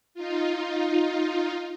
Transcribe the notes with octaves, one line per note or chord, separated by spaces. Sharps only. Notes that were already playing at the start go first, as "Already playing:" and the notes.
D#4 F4